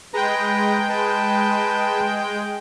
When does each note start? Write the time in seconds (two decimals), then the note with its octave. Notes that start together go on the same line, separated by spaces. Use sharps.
0.14 G#3 B4 G5 A#5
0.89 B4 A5